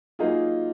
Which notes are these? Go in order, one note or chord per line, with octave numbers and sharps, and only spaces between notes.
F#3 A#3 D#4 F4 G#4